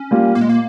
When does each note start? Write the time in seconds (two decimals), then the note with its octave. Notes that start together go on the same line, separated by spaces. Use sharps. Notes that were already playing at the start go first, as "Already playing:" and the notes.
Already playing: C#4
0.11 G3 A#3 F4
0.35 A#2 A#3
0.41 G#3
0.49 A#3